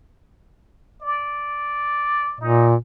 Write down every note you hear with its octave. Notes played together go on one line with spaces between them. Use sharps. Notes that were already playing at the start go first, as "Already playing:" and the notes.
D5
A#2 D#4